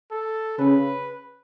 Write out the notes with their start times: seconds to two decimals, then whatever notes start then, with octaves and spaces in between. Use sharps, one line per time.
0.12 A4
0.59 C#3 B4